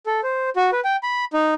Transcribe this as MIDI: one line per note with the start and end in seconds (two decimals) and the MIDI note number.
0.06 0.21 69
0.23 0.50 72
0.56 0.70 66
0.72 0.80 71
0.84 0.96 79
1.03 1.25 83
1.33 1.54 63